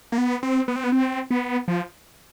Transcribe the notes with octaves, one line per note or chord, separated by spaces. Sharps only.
A#3
B3
C4
B3
C4
B3
C4
B3
F3